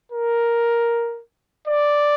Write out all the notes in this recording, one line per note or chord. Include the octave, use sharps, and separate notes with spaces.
A#4
D5